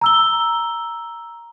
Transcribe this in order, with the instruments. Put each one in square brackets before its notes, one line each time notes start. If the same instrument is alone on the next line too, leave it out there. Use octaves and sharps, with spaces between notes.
[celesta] A#5 E6 G7